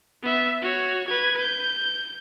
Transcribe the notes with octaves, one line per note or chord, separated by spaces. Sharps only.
B3 E5
F#4 C#5
B4 G#6
G6